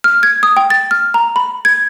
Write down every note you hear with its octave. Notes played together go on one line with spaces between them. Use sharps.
F6
G#6
D#6
G5
A6
F6
A#5
B5
G#6